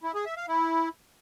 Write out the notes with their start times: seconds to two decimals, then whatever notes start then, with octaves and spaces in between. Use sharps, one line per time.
0.03 E4
0.15 G#4
0.26 E5
0.37 F5
0.48 E4